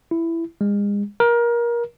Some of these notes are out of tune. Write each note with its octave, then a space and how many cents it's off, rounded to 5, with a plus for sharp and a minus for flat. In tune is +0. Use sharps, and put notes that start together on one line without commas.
E4 +10
G#3 -35
A#4 +25